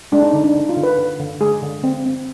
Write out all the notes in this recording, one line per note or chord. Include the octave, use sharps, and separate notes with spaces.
G#3 D4
D#4
D3 D#4
D4
D3 D#4
F4
D3
B4
D3
D3
G#3 G#4
D3
C4
C4